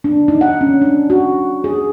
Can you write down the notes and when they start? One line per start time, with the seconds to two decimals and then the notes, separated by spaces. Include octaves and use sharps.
0.04 D4
0.28 D#4
0.41 F#5
0.61 C#4
0.81 D4
1.10 F#4
1.64 G#4